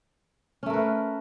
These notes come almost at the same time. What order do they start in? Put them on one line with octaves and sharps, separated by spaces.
C#4 A3 A#4 B4